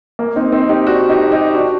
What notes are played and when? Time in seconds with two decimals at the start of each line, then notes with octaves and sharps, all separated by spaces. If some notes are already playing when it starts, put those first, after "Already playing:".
0.19 A#3
0.36 C4 D#4
0.52 C4 D#4
0.69 D#4 G4
0.86 D4 F#4
1.09 D#4 G4
1.32 D#4 G4
1.54 D4 F#4